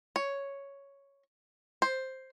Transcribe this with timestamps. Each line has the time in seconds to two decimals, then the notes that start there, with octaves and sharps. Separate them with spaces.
0.16 C#5
1.82 C5